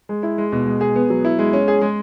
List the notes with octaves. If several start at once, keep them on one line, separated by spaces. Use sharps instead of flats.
G#3
E4
G#3
B2
G#3
G#4
B3
F#3
E4
G#3
C#4
G#4
G#3